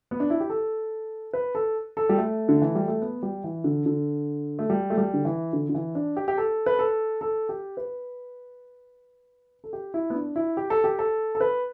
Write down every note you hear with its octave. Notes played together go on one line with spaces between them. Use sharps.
B3
D4
E4
G4
A4
B4
A4
A4
G3
A3
D3
E3
G3
A3
B3
G3
E3
D3
D3
A3
G3
A3
G3
D3
E3
D3
D3
E3
D4
G4
G4
A4
B4
A4
A4
G4
B4
A4
G4
E4
B3
D4
E4
G4
A4
G4
A4
A4
B4